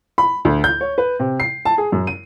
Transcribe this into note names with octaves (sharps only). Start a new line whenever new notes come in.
B5
D2
G6
C#5
B4
C3
C7
A5
G#4
F#2
D#7